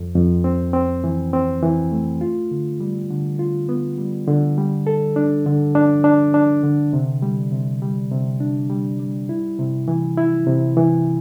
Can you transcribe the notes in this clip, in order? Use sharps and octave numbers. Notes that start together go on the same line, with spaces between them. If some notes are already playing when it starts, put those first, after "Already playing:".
Already playing: F2
F2
C4
C4
E3
C4
E3
A3
F4
D3
G3
D3
F4
B3
G3
D3
G3
A4
D4
D3
D4
D4
D4
D3
C3
G3
C3
G3
C3
D4
G3
G3
E4
C3
E3
E4
C3
E3